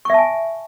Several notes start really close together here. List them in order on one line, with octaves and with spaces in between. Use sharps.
C#6 E5 A5 G#5